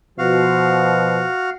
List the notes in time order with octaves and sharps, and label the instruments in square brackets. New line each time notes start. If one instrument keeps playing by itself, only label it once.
[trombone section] B2 F3 [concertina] F#4 F5